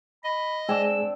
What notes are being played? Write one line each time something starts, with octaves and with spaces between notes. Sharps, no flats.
D#5 B5
G#3 C4 D4 G#4 G#5 E6